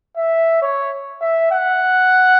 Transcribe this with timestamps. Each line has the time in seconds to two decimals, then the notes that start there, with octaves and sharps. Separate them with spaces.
0.17 E5
0.62 C#5
1.21 E5
1.52 F#5